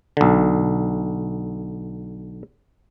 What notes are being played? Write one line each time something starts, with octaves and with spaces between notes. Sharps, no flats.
B1 D3